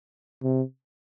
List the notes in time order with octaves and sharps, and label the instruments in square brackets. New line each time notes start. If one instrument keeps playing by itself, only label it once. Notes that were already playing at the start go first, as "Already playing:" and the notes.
[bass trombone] C3